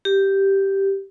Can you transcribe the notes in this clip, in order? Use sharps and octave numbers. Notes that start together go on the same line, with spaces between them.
G4